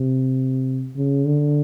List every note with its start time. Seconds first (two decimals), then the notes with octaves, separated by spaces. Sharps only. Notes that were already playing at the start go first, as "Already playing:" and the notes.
Already playing: C3
0.96 C#3
1.25 D3